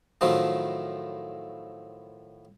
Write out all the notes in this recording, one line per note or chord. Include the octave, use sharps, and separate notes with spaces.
A2 D#3 F3 F#3 A3